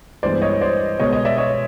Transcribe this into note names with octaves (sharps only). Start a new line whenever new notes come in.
G2 E3 G#3 B3 C5 D5
C#5 D#5
C5 D5
B2 G#3 B3 C#5 D#5
C#5 D#5
D5 E5
C#5 D#5